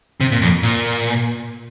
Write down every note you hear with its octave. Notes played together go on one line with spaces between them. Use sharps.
C3
A#2
F2
A#2